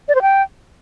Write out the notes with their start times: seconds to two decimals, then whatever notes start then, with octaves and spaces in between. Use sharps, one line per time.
0.08 D5
0.15 C5
0.22 G5